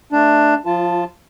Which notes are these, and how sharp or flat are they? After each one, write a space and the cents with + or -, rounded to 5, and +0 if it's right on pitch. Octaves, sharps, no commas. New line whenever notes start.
A3 +0 D4 +10
F3 +20 F4 -15 A5 +0